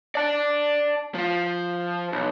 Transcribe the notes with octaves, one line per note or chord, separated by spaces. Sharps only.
D5 A5
F3 F4
B1